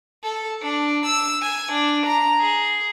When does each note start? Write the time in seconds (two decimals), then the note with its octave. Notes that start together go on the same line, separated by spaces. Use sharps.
0.23 A4
0.62 D4
1.06 E6
1.42 G#5
1.72 D4
2.06 A#5
2.40 G#4